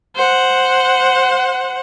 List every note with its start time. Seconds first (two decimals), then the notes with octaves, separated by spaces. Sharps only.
0.16 C5 F#5